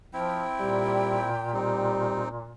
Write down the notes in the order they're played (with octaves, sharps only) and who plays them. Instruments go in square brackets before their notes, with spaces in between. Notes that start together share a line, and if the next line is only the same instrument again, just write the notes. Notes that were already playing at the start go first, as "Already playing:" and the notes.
[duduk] F3 [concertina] C4 E4 [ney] G5
[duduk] A#2 [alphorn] G3
[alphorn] G3 [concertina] C4 D#4